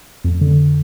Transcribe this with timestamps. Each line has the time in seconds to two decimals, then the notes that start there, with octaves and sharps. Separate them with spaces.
0.24 F2
0.41 D3